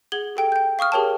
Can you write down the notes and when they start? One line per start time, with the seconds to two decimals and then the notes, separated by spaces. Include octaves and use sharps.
0.12 G#4 F#5 G#6 F#7 G7
0.36 G4 A4 G5 D7
0.52 G5 G6
0.79 F5 C#6 D#6 F6
0.92 G4 G#4 A#4 C#5 G5 A5